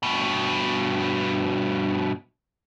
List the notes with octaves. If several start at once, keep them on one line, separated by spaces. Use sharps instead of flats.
G2 B2